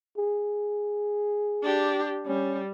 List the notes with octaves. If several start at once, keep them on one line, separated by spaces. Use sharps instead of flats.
G#4
D4 G4
G3 C#4